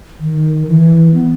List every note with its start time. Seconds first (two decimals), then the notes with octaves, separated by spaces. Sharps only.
0.20 D#3
0.67 E3
1.14 B3